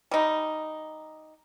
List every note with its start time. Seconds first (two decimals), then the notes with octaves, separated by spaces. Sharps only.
0.11 G3 D#4